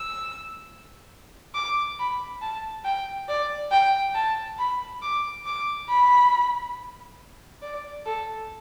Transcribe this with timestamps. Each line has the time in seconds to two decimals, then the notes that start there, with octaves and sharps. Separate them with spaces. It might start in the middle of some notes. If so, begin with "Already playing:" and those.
Already playing: E6
1.55 D6
1.99 B5
2.42 A5
2.85 G5
3.28 D5
3.71 G5
4.15 A5
4.58 B5
5.02 D6
5.46 D6
5.89 B5
7.62 D5
8.06 A4